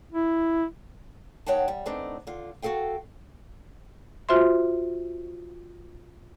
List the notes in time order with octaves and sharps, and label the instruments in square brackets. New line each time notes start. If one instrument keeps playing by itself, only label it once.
[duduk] E4
[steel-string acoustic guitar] D#2 F3 C#5 F#5 G5 A5
G3
E3 A3 B3 C4 D4 D#4
D3 F4
F#4 G4 A4 F5 G5
[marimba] F4 F#4 C5 E5 C6